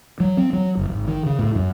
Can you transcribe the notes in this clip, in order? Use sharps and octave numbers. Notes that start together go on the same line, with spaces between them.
F#3
C4
F#3
F#1
G#1
D#3
C#3
A2
F#2